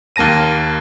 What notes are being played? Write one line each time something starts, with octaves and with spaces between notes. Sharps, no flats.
D#2 A#3 A5 A#6 D#7